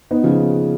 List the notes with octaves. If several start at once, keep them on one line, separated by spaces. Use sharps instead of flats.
B3 D#4
C#3 F3